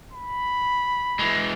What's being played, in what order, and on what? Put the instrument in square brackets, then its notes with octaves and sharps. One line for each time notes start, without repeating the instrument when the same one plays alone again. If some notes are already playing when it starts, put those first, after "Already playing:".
[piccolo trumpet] B5
[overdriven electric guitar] E3 G#3